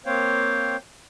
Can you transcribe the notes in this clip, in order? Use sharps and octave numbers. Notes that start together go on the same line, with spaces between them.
A#3 C4 C5 C#5 F5 G5